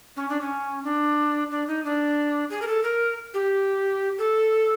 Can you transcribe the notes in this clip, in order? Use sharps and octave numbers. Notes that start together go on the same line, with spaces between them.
C#4
D4
C#4
D4
D4
D#4
D4
G#4
A#4
A4
A#4
G4
A4